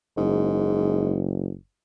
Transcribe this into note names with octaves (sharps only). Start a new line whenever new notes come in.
F#1 G#2